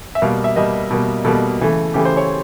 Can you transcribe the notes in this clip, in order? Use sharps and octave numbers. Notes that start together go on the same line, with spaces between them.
E5
B2 G3 A#3 F5
E5
B2 G3 A#3 D#5
B2 G3 A#3
B2 G3 A#3 A4
C#3 E3 A3
C#3 E3 A3 G4
C5
C#5